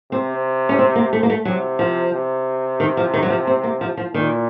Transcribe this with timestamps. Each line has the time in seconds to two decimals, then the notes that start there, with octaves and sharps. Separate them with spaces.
0.12 C3 C4
0.69 C#4
0.79 C4
0.95 A#3
1.13 A3
1.23 A#3
1.30 A3
1.45 C3 F#3
1.79 F3
2.13 C3
2.80 D#3
2.97 F3
3.14 D#3
3.23 F#3
3.30 F3
3.47 C4
3.64 A#3
3.81 F3
3.97 F3
4.14 A#2 D#3